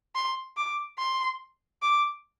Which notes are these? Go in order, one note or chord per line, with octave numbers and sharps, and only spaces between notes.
C6
D6
C6
D6